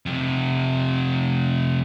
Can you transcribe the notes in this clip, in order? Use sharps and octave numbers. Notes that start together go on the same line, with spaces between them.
F2 C3